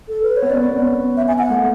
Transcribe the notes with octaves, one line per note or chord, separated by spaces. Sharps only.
A4
B4
C#5
B3
C#4 D5
B3
C#4
B3
E5
G#5
F#5
A3